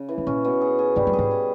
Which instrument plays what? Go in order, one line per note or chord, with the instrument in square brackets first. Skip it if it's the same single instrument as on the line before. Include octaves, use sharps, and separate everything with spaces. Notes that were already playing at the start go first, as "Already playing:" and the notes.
Already playing: [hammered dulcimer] C#3
E3
[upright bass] G#2
[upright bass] A#2 [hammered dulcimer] C#4
[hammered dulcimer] B2
G#4
G#4
[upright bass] G#2 [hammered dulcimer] G3
[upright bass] G2
[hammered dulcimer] G#4
[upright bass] G#2
[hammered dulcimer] G#4